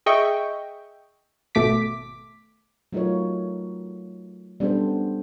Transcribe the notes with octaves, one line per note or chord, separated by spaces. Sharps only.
G#4 D#5 E5 G5 C#6
G#1 B2 A3 D6 B6
F#3 A3 D#4 F4 A#4 C#5
G3 B3 C#4 D4 A4 C5